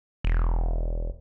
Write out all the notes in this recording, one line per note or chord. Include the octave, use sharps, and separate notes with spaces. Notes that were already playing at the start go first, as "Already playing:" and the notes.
E1